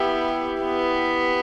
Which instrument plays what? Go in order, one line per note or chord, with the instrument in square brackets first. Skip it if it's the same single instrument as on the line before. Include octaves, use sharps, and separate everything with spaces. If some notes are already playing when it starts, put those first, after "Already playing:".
Already playing: [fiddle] B3 [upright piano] E4 G4
[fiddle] B3